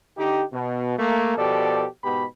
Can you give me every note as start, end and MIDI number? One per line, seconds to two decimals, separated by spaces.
0.17 0.43 50
0.17 0.43 63
0.17 0.43 67
0.52 0.94 47
0.98 1.34 57
0.98 1.34 58
1.37 1.85 47
1.37 1.85 53
1.37 1.85 67
1.37 1.85 69
1.37 1.85 74
2.04 2.25 44
2.04 2.25 47
2.04 2.25 59
2.04 2.25 67
2.04 2.25 83